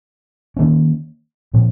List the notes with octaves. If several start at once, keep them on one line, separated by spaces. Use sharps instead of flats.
D#3 F#3 A#3 C#4
A#2 F3 C4